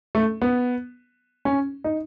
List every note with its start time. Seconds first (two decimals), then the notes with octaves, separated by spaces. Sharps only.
0.15 A3
0.42 B3
1.45 C#4
1.84 D#4